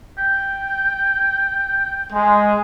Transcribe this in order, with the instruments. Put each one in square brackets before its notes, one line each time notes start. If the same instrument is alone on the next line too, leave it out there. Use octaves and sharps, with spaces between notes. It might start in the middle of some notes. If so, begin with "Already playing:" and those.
[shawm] G5
[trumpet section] G#3